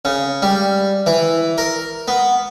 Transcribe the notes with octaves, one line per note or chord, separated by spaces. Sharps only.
C#3
G3
E3
A#4
B3